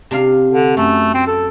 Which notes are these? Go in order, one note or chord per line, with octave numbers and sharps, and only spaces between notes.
C3 D4 F5
D3
F#2 A3
C4
A4